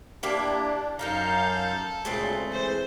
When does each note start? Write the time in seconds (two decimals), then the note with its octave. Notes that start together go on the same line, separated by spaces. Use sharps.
0.23 A#3 D4 E4 G4
0.99 F#2 D#4 E4 A4 A#4 F5 G6
2.05 D2 A#2 C#3 G#3 A3 C4
2.52 E3 C5